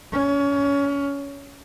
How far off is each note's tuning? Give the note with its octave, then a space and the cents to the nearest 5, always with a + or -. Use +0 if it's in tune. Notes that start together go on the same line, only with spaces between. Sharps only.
C#4 +25